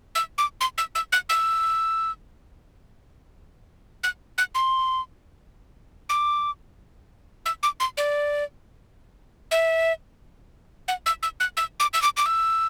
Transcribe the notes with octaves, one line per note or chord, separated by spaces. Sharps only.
E6
D6
C6
E6
E6
F#6
E6
F#6
F#6
C6
D6
E6
D6
C6
D5
E5
F#5
E6
E6
F#6
E6
D6
E6
D6
D6
E6